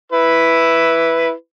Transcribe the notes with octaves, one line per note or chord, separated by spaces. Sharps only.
E4 B4